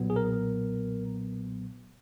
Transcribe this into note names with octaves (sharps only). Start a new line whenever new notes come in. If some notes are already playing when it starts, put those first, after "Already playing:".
Already playing: B1 A#2 F#3 B3
G#4
A#4